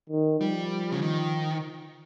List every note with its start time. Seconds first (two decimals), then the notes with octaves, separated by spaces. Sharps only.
0.10 D#3
0.40 F3 G3
0.92 C#3
1.02 D#3